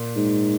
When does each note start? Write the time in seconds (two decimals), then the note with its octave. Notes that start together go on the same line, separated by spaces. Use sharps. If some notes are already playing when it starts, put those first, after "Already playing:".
Already playing: A#2
0.16 G#2